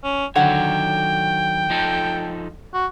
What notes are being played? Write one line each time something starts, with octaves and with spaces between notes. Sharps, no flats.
C#4
D3 D#3 F#3 C#5 F#5 G5
F3 D#4 A4
F#4